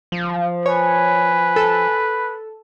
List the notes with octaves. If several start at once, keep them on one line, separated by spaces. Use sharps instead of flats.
F3
B4 C#5 G#5
A4